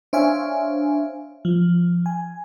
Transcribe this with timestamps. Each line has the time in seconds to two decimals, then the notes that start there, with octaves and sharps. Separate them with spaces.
0.13 D4 C5 C#5 E5 F5 G#5
1.45 F3
2.06 G#5